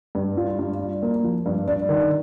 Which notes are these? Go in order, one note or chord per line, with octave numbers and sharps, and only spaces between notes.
G2
F4
G2
D4
A#3
F3
G2
D4
D#3